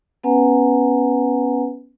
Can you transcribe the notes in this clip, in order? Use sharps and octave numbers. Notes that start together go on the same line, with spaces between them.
B3 C#4 B4 F#5 G#5 A#5